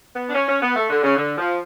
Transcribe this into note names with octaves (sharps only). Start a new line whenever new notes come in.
B3
D4
C#4
C#4
B3
A3
D3
C#3
D3
F3